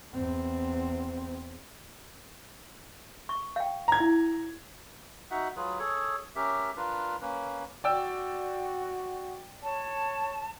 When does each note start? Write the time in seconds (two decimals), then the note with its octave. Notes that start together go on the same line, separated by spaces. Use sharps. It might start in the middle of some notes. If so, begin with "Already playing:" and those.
0.13 E2 C4
3.29 C#6
3.56 F5 G5
3.88 A#5 G#6
4.00 E4
5.31 D#4 F#4 E5 F#5
5.56 F#3 F4 G#4 B4
5.79 G#4 A4 C#5
6.36 C#4 G4 A#4 E5
6.77 D4 F4 A#4 B4
7.21 A#3 C#4 B4
7.84 F#4 D5 G5 E6
9.63 C#5 A5